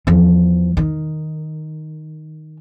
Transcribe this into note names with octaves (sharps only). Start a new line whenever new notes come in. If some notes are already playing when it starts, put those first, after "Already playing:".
E2 F3
D#3